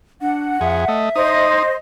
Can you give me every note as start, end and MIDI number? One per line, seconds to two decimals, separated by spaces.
0.21 0.60 62
0.21 0.96 78
0.61 0.85 41
0.61 0.85 68
0.61 1.47 76
0.88 1.09 57
0.88 1.09 75
1.16 1.63 63
1.16 1.73 72
1.16 1.73 75
1.16 1.63 87